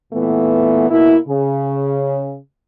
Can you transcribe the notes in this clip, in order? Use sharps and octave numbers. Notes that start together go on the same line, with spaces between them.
A#2 E3 A3 B3
B2 A#3 E4
C#3